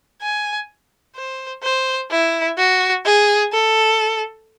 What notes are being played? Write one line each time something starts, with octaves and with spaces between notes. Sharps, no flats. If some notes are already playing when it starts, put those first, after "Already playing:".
G#5
C5
C5
E4
F#4
G#4
A4